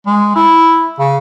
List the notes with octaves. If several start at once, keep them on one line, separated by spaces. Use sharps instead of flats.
G#3
E4
C#3